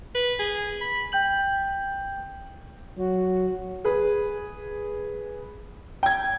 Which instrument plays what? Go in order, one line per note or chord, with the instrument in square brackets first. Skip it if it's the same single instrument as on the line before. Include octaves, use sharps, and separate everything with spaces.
[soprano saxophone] B4
G#4
B5
[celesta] G5 G6 F#7
[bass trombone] F#3 [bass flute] F#4
[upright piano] G#4 B4
G5 G#6